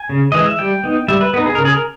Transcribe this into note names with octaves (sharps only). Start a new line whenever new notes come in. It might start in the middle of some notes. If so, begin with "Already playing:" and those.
Already playing: G#5
C#3
E3 G#3 D#5
E5
G3 G5
B3 D#4
G3 E5
B4
B3 D#4 B4
G#4
C#3 A#4
G#4
A#4